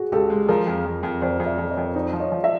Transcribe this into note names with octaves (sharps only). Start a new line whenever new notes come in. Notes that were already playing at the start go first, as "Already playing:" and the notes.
Already playing: F#4 G#4
C#2 G4 A4
G#3
F3 G#4 A#4
F2
F2
F2
F2 C5 D5
F2
D5 E5
F2
D5
C#5 D#5
F2
D#4 C5 D5
F3
C#5 D#5
F3
D5 E5